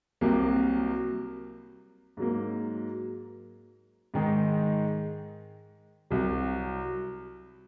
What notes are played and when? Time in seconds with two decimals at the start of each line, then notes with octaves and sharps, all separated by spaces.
0.21 C2 C3 F#3 A#3
2.17 G#2 F#3 A#3
4.14 G#2 D#3 G#3 D#4
6.10 C2 C3 F#3